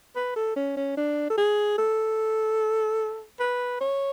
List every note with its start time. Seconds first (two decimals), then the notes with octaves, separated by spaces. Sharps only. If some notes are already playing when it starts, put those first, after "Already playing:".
0.16 B4
0.36 A4
0.56 C#4
0.77 C#4
0.97 D4
1.30 A4
1.37 G#4
1.78 A4
3.40 B4
3.81 C#5